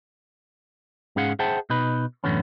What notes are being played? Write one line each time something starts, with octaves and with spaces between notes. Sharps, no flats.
G#2 C#4 G#4 F5 F#5
G#4 C5 E5 F#5 G5 A5
B2 D#4 B4
F#2 A2 D3 E3 B3 C#4